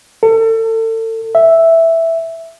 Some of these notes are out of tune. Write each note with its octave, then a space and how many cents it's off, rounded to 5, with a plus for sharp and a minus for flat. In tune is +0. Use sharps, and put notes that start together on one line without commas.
A4 +35
E5 +0